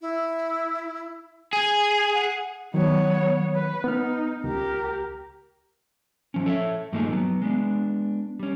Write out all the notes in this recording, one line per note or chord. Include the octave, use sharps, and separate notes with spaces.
E4
G#4 G#5
F#5
D#3 F#3 B3 C#5
B4
B3 D#4 F6
C#2 G4 A#4
F3 C#4
A4 C#5 D5 E5
G2 F3 A3 A#3 D#4 G#4
F#3 B3
G#3 B3 D4
G3 C#4